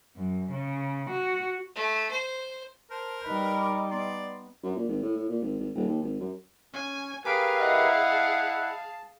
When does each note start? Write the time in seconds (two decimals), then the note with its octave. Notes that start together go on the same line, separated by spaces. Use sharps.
0.16 F#2
0.51 C#3
1.09 F#4
1.75 A3
2.11 C5
2.91 A#4 C5 A5
3.23 G3 D#4 B4 B5
3.58 D6
3.91 B3 D5 C6
4.63 F#2
4.76 A#2
4.89 G#1
5.02 A2
5.16 A2
5.29 A#2
5.42 G#1
5.59 G#1
5.75 D#1
5.87 D#2
6.03 G#1
6.20 F#2
6.74 C#4 G#5
7.25 G4 G#4 A#4 B4 F5 G#5 B6 D7
7.60 E4 D#5 E5 F#5
8.11 A5